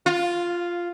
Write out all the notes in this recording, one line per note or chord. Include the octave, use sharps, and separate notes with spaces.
F4